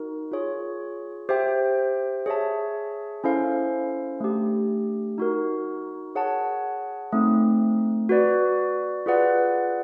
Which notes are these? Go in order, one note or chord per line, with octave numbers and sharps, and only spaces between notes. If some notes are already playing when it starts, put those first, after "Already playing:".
Already playing: D#4 F#4 A#4
F4 G#4 C#5
G4 C5 E5 G5
G#4 C#5 E5 A5
C#4 E4 A4 C5 F5
A3 D4 G4
D#4 F#4 A#4
G#4 C#5 F#5 A5
A3 C4 D#4
F#4 B4 D5
F4 G#4 B4 D5 F#5